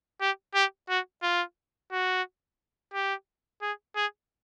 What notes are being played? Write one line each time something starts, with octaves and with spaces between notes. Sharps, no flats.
G4
G4
F#4
F4
F#4
G4
G#4
G#4